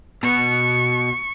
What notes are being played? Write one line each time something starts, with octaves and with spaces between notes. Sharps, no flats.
B2 C#6